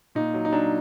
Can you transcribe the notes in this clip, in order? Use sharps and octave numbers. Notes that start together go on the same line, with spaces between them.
A#2 D#4
F#3
D#4
F#3 D4